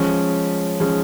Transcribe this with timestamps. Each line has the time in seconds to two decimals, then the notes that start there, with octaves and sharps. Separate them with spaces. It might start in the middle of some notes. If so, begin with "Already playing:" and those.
Already playing: F3 G#3 C#4
0.80 F3 G#3 C#4